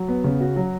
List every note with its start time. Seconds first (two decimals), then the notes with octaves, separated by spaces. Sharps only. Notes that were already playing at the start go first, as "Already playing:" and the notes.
Already playing: F#3
0.08 B3
0.24 C#3
0.40 F#4
0.56 F#3